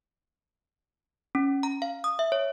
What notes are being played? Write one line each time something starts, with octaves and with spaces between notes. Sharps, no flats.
C#4
A#5
F5
D#6
E5
C#5